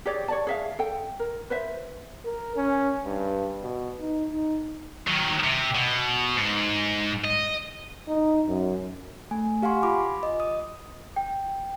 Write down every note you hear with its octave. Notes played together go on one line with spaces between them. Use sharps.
G4 G#4 C#5 D5
C#5 D5 A5
G#4 E5 F5
A4 G5
A#4
B4 C5 E5
A#4
C#4
G2
B2
D#4
D#4
D#3 F#3
C3
B2
G#2
D#5
D#4
F#2
A3 G#5
G4 F5 F#5 G#5 C6 C#6
F4 B5 D6
D#5
D#6
G5